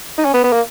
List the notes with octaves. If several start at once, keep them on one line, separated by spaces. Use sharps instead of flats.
D#4
C#4
B3
B3
A#3